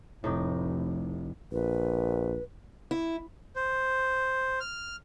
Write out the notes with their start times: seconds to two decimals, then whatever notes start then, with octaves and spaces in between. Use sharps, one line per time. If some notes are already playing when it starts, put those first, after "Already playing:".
0.24 F1 A2 D#4 G4
1.52 A#1 B4
2.91 E4
3.56 C5
4.60 F6